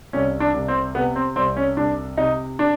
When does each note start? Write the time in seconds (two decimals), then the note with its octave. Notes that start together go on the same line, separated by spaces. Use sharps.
0.13 C2 C#4
0.40 D4
0.54 C2
0.68 C4
0.95 C3 B3
1.16 C4
1.36 C2 C4
1.57 C#4
1.77 C2 D4
2.17 C3 D#4
2.59 D4